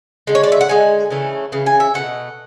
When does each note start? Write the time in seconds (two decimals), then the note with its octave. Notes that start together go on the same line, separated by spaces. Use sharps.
0.27 D3 G#3
0.35 C#5
0.43 D5
0.52 E5
0.61 F#5
0.68 D3 G#3 G#5
1.11 C#3 E3 A3
1.52 C#3 E3
1.66 G#5
1.80 E5
1.94 B2 F#3 A3 F#5